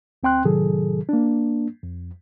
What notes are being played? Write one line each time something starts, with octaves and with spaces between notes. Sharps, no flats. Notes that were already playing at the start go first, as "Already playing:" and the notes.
D2 C4 G5 C6 F#6
A2 C3 D#3 F#3 G#4 A4
A#3 D4
F2